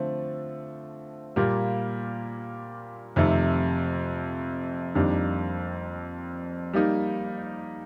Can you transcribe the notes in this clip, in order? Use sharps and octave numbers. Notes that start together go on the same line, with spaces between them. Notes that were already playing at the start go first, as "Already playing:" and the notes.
Already playing: D3 F3 A3 C4
A#2 G3 A#3 F4
F2 C3 D#3 A3
F2 D#3 G3 A#3 D4
G3 A#3 D#4